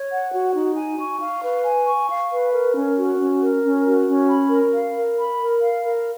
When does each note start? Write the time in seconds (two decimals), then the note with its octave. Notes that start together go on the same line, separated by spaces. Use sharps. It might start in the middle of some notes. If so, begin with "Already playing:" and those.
Already playing: C#5
0.10 F#5
0.32 F#4
0.53 D#4
0.75 G#5
0.98 C#6
1.20 F5
1.42 B4
1.63 G#5
1.86 C#6
2.08 F5
2.31 B4
2.52 A#4
2.75 C#4
2.97 F#4
3.18 C#4
3.41 A#4
3.63 C#4
3.84 F#4
4.06 C#4
4.28 B5
4.50 A#4
4.73 F5
4.95 A#4
5.17 B5
5.39 A#4
5.60 F5
5.83 A#4